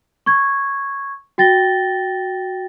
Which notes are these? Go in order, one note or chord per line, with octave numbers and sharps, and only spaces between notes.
C#6 G#6
F#4 G5 A6 A#6 G7